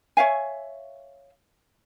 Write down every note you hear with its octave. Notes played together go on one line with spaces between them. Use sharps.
C#5 E5 F5 G#5